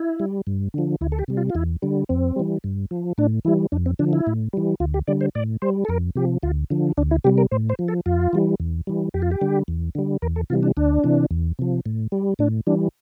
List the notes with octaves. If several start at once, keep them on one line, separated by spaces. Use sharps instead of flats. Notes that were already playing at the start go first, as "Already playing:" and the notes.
Already playing: E4
G3
G2
D3 F3
D2 E4
A4
G4
C3 G3
F4
F4
E2 E4
D3 G3
F2 C4
E3 G3
G2
F3
A2 D4
E3 G3 E4
F2 D4
C4
D3 F3 D4
E4
A2
E3 G3
D2 F4
G4
D3 G3 D5
C5
A2 D5
G3 C5
A4
F2 A#4
C3 F3 G4
D2 F4
D3 F3
D2 D4
E4
C3 G3 G4
A#4
A2 C5
C5
F3
A4
F2 F4
E3 G3
E2
E3 G3
F2 G4
F4
G4
D3 G3
E2
D3 G3
E2 A#4
A4
C3 E3 G3 F4
D4
D2 D4
C3 E3
E2
C3 F3
A2
G3
A2 D4
E3 G3 D4